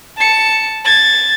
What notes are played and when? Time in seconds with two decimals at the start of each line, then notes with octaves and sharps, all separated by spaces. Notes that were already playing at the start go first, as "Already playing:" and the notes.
0.17 A5 C#7
0.85 G#6 A6